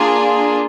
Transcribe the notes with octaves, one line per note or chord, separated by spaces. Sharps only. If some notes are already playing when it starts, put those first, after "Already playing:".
Already playing: A#3 D4 F4 G#4